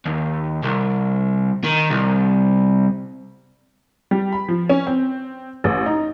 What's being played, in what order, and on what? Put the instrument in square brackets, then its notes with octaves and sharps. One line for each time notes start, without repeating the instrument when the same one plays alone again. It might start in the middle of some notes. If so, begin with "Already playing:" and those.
[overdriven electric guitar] D#2
C2
D#3
C2
[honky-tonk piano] G3
B5
F3
C#4
C4
A1
D#4